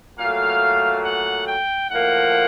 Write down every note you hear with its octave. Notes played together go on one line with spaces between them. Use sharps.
A#2 F#3 A3 F5
F#5
G5
A2 F3 A#3 F#5